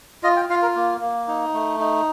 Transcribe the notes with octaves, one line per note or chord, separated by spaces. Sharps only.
F4 D#5
G5
F4 F5
A#4
A#3
A#3
D#4
A3
D#4